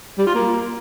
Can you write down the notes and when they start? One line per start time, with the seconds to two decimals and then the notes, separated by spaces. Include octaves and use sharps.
0.18 G3
0.26 F4
0.35 A#3